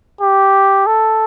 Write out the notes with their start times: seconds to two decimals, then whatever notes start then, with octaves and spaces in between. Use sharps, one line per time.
0.21 G4
0.87 A4